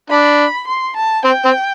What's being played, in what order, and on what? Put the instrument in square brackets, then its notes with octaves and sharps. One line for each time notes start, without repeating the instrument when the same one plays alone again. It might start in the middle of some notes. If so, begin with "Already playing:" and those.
[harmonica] D4 [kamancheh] B5
[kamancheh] C6
A5
[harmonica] C4 [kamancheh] G5
[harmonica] C4